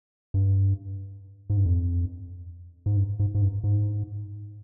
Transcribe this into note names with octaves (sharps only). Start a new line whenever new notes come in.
G2
G#2
G2
F2
G#2
G2
G#2
G#2
G2
G#2